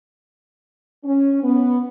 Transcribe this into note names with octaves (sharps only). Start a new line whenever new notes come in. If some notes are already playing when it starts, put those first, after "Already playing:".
C#4
B3